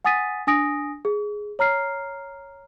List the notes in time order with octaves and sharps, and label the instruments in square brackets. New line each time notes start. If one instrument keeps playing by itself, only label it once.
[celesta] F#5 G#5 D#6 A6 B6 D#7
D4 G#5 D#6 A#6 D7
G#4
C#5 A#5 F6 C7